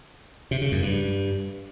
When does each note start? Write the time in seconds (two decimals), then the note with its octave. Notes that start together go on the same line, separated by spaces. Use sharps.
0.51 C3
0.62 C#3
0.72 F#2
0.82 G2